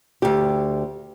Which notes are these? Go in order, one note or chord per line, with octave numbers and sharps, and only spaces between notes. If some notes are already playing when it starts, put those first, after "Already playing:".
D2 G4